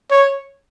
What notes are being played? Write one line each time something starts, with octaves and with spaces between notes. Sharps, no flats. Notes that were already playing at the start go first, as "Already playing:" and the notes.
C#5